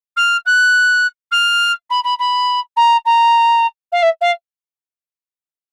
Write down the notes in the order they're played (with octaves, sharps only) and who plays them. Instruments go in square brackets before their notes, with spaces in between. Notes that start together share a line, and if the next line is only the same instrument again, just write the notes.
[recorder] F6
F#6
F6
B5
B5
B5
A#5
A#5
F5
E5
F5